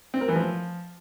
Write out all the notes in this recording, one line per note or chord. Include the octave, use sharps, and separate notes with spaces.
C4
A#4
E3
F3